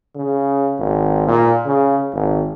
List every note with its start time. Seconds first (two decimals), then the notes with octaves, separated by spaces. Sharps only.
0.16 C#3
0.79 G#1
1.28 A#2
1.66 C#3
2.13 G#1